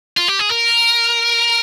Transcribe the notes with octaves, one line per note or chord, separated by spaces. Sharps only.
F4
G4
G#4
A#4